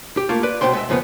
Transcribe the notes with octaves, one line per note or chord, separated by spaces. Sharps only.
G4
A3 A#3 F4
B4 D5
B1 F2 B2 C5 G5 C6
G#3 D#5 E5
F2 C#3 F3 G3 B3